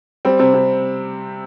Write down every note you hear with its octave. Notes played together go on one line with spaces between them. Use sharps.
G3 C4
C3
C3